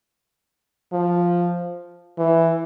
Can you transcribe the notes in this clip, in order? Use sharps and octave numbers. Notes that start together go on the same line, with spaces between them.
F3
E3